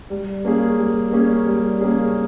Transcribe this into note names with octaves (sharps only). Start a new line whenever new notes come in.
G3
A#3 C#4 G#4
G3
A#3 C#4 G#4
G3
A#3 C#4 G#4